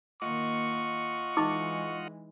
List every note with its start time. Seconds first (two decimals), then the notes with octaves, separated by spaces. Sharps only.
0.22 D#3 A#3 F4 D#5 F#5 C#6
1.37 E3 G#3 D#4 D6